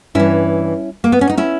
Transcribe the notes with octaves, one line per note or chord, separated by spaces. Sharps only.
G2 E3 C#4 E4
A#3
B3
C#4
D#4
C#4 E4